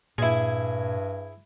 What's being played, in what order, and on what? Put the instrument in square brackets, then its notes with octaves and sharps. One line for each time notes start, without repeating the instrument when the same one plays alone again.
[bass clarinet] G2 [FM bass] A#2 [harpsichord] E4 G#4